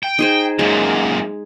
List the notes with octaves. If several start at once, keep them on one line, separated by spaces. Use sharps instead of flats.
G5
D#4 G#4 C5
F#2 A#2 G#3